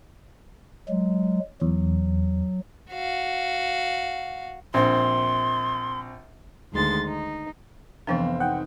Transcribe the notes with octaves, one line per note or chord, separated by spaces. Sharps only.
F#3 G#3
E2 F#3
F#4 F5
A#1 C4 C6
D2 D#3 G#3 C6 A6
D#4
F1 E3 F3 B3 C4 D4 C5 F5
D#4 F#5 G5